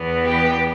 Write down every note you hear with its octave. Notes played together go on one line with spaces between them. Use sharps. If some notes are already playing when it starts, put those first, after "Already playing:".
Already playing: E2 E3 B3
G4